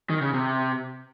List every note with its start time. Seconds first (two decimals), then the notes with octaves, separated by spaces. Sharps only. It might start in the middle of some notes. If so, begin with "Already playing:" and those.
0.10 D#3
0.22 C#3
0.33 C3